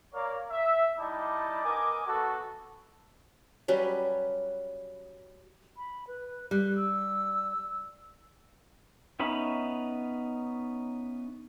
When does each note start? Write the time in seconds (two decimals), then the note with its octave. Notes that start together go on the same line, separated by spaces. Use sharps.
0.14 A#3 A#4 C#5 D5 F5
0.51 E5
0.99 G3 D#4 E4 D5 A5 D6
1.64 B3 A#4 D#5 G#5 D6
2.07 B3 F#4 A4
3.68 F#3 G3 C#4 B4
5.77 B5
6.08 B4
6.51 G3 F#6
6.76 E6
9.20 B3 C#4 D#4 E5 B5